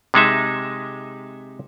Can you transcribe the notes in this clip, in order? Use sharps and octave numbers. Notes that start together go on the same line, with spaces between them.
C3 G#3 D#4 E5